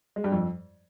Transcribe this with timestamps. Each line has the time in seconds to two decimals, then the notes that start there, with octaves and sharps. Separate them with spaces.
0.16 G#3
0.24 G2
0.32 F2